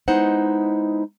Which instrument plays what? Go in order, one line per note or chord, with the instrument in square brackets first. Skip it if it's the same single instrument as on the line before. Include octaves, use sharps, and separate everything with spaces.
[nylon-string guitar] G#3 B3 D#4 E4 C5 F#5